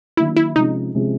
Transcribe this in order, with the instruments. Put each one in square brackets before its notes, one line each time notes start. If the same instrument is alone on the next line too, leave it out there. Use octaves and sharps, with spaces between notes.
[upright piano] D#3 F#3 A#3 D4 [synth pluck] E4
[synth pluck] E4
[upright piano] C3 F3 G#3 C#4 [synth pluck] D#4
[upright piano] C3 F3 G#3 C#4